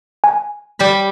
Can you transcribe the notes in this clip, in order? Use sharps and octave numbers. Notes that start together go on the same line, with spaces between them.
G#5
G3 G4 B5